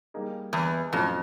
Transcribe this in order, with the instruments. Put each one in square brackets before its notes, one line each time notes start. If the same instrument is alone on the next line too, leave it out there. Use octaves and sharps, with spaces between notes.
[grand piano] G3 A#3 D#4 G#4
[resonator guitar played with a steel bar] E2
[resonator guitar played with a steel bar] F2 [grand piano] A2 F#3 A3 C#4 F4